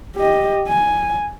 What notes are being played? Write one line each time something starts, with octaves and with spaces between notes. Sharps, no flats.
G4 D#5
G#5